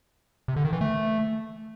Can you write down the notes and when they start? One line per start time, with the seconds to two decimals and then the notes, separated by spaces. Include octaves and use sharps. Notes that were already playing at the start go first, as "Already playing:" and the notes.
0.48 C3
0.56 D3
0.65 D#3
0.73 E3
0.81 A3